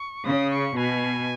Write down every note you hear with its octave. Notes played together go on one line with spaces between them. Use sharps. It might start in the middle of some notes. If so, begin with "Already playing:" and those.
Already playing: C#6
C#3 D#6
C#6
B2 G#5